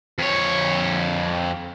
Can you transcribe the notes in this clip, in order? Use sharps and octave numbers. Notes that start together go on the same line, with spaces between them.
F2 C#5